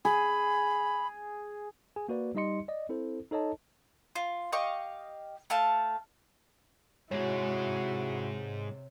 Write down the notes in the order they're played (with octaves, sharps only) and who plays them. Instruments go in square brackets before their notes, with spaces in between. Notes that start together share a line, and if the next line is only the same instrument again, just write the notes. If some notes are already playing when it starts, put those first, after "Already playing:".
[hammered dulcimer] G#4 [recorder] B5
[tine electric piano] G#4 G#5
A#3 F#4 B4 D5
G3 D#4 G4 D#5 C6 C#7
D5 D#5
C4 E4 A4 C5
D#4 A4 C#5 D#5 A5
[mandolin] F4
G4 D#5 F5 C#6
A3 F5 A5
[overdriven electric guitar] G#2 G#3 [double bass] C3 [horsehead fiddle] E4 F#4 [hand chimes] C#5